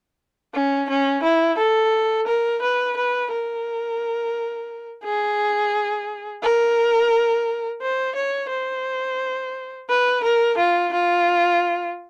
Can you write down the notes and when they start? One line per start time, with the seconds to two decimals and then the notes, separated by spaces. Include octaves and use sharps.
0.54 C#4
0.90 C#4
1.23 E4
1.58 A4
2.27 A#4
2.62 B4
2.97 B4
3.32 A#4
5.04 G#4
6.43 A#4
7.82 C5
8.15 C#5
8.50 C5
9.89 B4
10.24 A#4
10.58 F4
10.93 F4